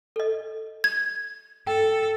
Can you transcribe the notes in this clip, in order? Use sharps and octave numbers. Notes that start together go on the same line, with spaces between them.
A4 D#5
G#6
A4 G5